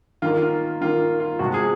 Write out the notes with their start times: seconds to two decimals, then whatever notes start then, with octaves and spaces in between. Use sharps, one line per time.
0.22 D#3 A#3 F4
0.37 F4
0.81 D#3 A#3 F4
1.20 F4
1.39 C3 F3 G#3 F#4
1.54 G#4